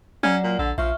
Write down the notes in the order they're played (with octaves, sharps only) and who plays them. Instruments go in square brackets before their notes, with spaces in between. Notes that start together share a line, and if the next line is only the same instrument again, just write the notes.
[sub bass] F#3 [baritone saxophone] C#4 [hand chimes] D5 F#5 A#5
[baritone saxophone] A#2
[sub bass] A#1 [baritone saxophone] D3
[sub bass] A#1 [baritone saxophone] F3 [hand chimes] E5 C#6 F6